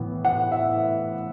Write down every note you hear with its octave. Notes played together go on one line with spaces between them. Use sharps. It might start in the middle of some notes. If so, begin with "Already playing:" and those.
Already playing: A2 E3 B3
F#5
E5